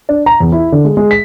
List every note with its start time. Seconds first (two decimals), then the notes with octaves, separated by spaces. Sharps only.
0.09 D4
0.26 A#5
0.40 E2
0.52 E4
0.72 D3
0.85 G#3
0.97 G#3
1.11 B6